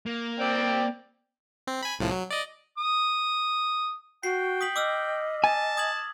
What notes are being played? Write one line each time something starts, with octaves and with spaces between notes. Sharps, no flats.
A#3
C4 D5 G5
C4
G#5 B5
C2 A2 F3
F#3
D5 D#5
D#6
F#4 G5 C7
D#6 B6 F#7
D#5 D6 E6 F6
G#5 A5
D#6 G#6 F#7